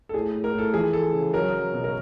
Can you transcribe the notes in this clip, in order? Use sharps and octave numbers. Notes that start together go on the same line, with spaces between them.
A4
A2 G#4
A2
A#4
A2 A4
E3 G#4
E3 A4
C#3
F#3 A#4
F#3
B2
A#4